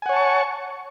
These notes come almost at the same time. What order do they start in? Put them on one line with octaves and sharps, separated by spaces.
G#5 F#5 C#5 A5 C#6